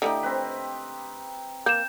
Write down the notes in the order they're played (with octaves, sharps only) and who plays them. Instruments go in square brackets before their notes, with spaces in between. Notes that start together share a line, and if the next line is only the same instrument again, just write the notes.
[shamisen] D3 A3 E4 [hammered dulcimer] D#4 G4
[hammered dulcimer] C4 B4
[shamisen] A#3 [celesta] G6 E7